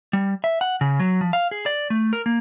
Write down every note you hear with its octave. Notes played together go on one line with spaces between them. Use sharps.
G3
E5
F#5
C#3
F#3
F3
F5
G#4
D5
A3
A#4
A#3